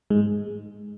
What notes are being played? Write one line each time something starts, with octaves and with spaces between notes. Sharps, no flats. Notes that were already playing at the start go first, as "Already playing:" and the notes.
G#2 G#3